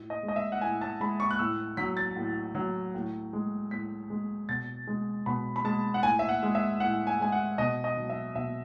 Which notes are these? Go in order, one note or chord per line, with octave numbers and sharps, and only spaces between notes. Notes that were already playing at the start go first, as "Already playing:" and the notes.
Already playing: A2
D#5
G#3
D#5
E5
F#5
A2 G#5
A5
G#3 B5
C#6
F#6
A2 E6
F#3 B6
A6
A2
F#3
A2
G#3
A2 B6
G#3
B2 A6
G#3
B2 B5
B5
G#3 A5
F#5
A2 G#5
E5
F#5
G#3
E5
A2 F#5
G#5
G#3 G#5
F#5
B2 D#5
D#5
F#3
E5
B2 E5